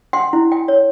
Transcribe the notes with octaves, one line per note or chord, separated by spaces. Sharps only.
F#5 G5 C6
E4
G5
C#5